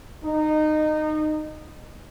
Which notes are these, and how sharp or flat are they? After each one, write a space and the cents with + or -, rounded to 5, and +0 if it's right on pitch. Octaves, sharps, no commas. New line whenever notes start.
D#4 -20